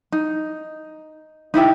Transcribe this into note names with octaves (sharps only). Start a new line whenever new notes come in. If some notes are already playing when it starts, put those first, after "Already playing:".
D#4
D#4 E4 G4 E5